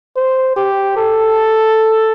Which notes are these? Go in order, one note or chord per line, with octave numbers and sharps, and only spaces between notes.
C5
G4
A4